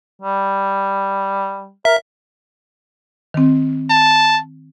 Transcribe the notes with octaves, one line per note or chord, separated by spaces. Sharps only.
G3
A#4 E5
D#3 C4
A5